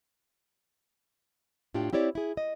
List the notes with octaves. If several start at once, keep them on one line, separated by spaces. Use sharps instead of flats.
A2 D4 F4 G4 G5
C4 E4 G4 C#5 D5
E4 G#4
D#5